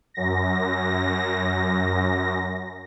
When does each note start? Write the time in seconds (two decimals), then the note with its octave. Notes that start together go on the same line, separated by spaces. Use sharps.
0.14 F#2 A#6